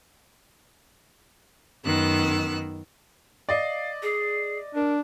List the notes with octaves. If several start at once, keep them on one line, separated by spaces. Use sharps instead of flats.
F#2 D#3 B3 E6 F#6
D5 D#5 F5
G#4
D4 A#4